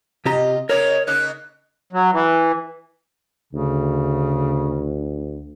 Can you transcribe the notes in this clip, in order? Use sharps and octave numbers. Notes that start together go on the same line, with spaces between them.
C3 F4 G4 D#5 A#5
C#3 G#3 A#3 A#4 C#5
C#3 A#3 D#4 F#6
F#3
E3
D2 C#3